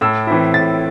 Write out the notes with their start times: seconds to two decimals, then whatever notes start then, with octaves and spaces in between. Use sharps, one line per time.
0.01 A2 E6
0.27 E3 C4 E4
0.54 A2 A6